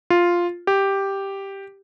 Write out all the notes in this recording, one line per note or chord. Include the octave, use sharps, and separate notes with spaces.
F4
G4